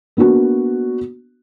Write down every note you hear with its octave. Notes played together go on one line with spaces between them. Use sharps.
A#3 B3 D4 F#4